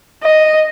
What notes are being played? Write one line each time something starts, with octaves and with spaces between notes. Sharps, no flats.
D#5